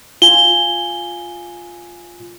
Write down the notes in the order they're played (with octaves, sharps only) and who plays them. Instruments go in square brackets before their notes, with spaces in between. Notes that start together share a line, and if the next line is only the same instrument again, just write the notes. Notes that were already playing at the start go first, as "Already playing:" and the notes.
[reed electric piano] F4 G#5 [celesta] G7